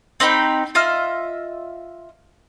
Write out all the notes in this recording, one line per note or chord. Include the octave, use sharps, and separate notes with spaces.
C4 D#4 G4 B5
F4 D#5 E5 F6